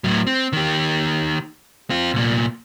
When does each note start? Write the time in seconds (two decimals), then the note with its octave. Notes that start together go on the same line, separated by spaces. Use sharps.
0.04 A2 F#3
0.27 C4
0.53 D#3 G4
1.90 C4 F4
2.14 C2 A#2